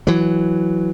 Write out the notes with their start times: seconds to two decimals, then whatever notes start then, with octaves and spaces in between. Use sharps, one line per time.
0.07 E3 F#3